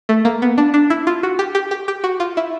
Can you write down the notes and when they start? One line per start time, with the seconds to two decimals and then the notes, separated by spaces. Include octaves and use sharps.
0.09 A3
0.25 A#3
0.42 B3
0.58 D4
0.74 D4
0.90 E4
1.07 F4
1.23 F#4
1.39 G4
1.55 G4
1.71 G4
1.88 G4
2.04 F#4
2.20 F4
2.37 E4